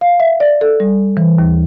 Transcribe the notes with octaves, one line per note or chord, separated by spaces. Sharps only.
F5
E5
D5
A4
G3
E3
D#2